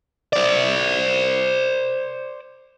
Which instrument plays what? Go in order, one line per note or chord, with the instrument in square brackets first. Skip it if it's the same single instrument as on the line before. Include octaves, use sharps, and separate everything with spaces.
[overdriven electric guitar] C5 D5